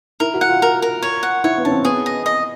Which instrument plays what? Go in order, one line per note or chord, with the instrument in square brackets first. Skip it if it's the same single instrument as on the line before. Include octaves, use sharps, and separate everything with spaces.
[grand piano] E4 [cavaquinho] A#4
[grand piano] F#4
[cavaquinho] F#5
[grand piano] F4
[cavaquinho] A#4
A#4
C#5
F#5
[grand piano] E4 [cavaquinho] C#5
[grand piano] B3
[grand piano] C#4 [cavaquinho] A5
[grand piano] C4
[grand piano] B3 [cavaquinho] G#4
[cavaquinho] D#5
D#5